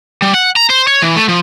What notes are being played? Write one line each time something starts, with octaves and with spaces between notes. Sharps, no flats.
G3
F#5
A#5
C5
C#5
E3
A3
F3